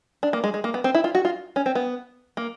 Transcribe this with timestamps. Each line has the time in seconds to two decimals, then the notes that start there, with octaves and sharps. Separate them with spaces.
0.23 D4
0.33 A#3
0.44 G#3
0.54 G#3
0.64 A#3
0.74 B3
0.84 C4
0.95 E4
1.04 F4
1.15 F#4
1.25 F4
1.56 C#4
1.66 C4
1.75 B3
2.37 A#3